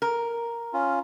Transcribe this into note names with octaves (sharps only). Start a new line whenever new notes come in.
A#4
C#4 F4